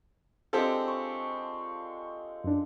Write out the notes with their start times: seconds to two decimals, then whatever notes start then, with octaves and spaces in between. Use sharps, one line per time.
0.53 G#3 C4 D4 F4 G4 A4
0.88 C5 C#6
2.44 F#2 D4